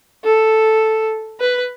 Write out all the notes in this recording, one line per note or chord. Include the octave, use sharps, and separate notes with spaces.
A4
B4